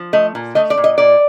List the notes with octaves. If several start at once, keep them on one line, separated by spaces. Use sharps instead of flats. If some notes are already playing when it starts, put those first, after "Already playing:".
Already playing: F3
A3 D#5
A#2
A3 D#5
D5
A#2
D#5
A#2 D5